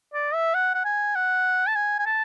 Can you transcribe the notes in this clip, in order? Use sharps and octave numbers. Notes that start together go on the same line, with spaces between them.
D5
E5
F#5
F#5
G#5
F#5
A5
G#5
G#5
A5